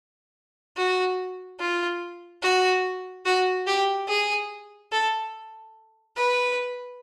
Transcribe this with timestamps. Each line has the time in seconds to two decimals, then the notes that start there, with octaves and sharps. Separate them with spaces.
0.77 F#4
1.60 F4
2.42 F#4
3.26 F#4
3.67 G4
4.08 G#4
4.92 A4
6.16 B4